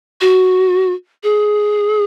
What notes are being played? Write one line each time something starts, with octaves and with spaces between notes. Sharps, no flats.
F#4
G#4